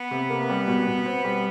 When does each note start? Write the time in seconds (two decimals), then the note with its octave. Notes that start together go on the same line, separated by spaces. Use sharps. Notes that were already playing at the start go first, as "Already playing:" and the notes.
Already playing: B3
0.11 C3
0.30 A#3
0.50 G3
0.67 B2
0.87 B2
1.06 C4
1.25 G3